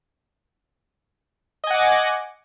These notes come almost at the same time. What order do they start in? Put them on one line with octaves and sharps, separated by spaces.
D#5 G#5 F#5 D6